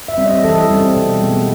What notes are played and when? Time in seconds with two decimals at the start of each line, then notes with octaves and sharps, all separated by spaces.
0.08 E5
0.18 G3 C4
0.26 D#5
0.44 E3 A4
0.70 G3 C4
0.95 B2
1.21 G#3 B3